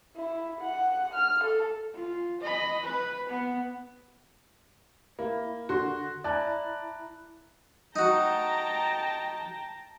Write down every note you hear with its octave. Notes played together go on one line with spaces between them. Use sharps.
E4
F#5
F6
A4
F4
D#5 B5
B4
B3
A#3 E4
D3 F#4 C6
E4 D5 A5 A#5 F#6
D#4 F#4 G5 A5 A#5